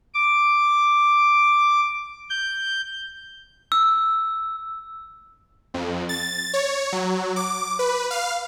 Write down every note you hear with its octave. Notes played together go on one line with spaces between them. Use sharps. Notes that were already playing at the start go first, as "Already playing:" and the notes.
D6
G6
E6
F2
A6
C#5
F#3
D6
B4
F5